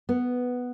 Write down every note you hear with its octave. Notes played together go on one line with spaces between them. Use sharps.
B3